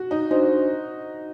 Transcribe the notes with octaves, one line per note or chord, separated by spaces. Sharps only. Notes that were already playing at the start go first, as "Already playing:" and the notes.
Already playing: F#4
D#4
D4 D#4 F#4 C5